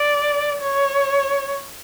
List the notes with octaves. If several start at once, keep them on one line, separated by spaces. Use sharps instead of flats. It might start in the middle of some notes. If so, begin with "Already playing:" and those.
Already playing: D5
C#5